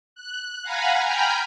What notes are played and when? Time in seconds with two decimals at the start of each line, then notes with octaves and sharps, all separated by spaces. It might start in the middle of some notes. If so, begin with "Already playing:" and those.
0.15 F#6
0.63 F5 F#5 G#5 A#5 B5
1.01 G5 G#5 A#5 B5 F6 G6